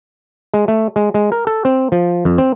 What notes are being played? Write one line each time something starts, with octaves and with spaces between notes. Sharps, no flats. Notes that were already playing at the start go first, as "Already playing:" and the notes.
G#3
A3
G#3
G#3
A#4
A4
C4
F3
F2
C4